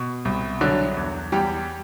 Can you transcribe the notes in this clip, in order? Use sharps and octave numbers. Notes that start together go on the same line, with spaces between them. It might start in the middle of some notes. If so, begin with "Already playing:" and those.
Already playing: B2
C2
D3 F#3 D4
E2
E2 G3 G4